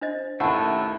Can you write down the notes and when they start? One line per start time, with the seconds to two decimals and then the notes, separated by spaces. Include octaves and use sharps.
0.01 D4 C5 D#5
0.40 A1 D#2 A3 E4 F#5 A5